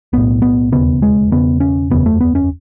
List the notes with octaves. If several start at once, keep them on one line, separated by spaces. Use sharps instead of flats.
B1 A2 B3
B3
E1 D#2 C#3 B3
G#3
E1 E2 C#3 B3
C#4
F#1 E2 C#3 B3
A3
B3
C#4